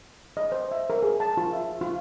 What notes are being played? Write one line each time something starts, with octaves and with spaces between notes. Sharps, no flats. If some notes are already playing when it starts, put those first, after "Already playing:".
D#5
C5
E5
A#4
G#4
A5
F4
E5
F4